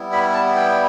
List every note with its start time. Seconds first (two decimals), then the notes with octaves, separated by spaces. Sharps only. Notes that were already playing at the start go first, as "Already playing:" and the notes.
Already playing: G3 B3 E4
0.13 B5
0.34 A5
0.56 G5